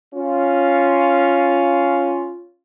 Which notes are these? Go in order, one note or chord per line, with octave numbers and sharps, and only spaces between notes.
C#4 F4